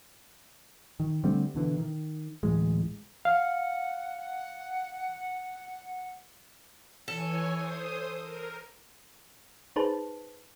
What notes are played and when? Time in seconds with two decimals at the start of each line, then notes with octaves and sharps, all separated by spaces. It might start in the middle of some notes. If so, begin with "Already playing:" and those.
1.00 D#3
1.24 D3 G3 A3 C4
1.55 B2 D3 E3
1.78 D#3
2.43 D1 A1 E3 G#3
3.25 F5 F#5
7.08 E3 A4 C#5 G#5
7.51 C5 D#6
8.21 A#4
9.76 D#4 G#4 B4 C5 A5